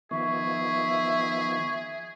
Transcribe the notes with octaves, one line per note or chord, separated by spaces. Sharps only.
D#3 F3 B3 G#4 E5 C#6